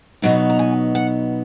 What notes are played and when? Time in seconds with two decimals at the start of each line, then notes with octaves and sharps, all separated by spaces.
0.22 B2 F#3 B3 D#4 D#5
0.50 A#5
0.59 G#5
0.95 F#5